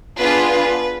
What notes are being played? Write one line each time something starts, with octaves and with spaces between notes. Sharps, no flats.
B3 D4 F4 G#4 B4
B4